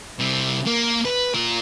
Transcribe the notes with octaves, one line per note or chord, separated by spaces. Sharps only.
C3 G3
A#3
B4
F4 A#4